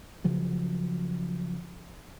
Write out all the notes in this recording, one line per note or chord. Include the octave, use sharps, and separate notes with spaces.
C#3 F3 F#3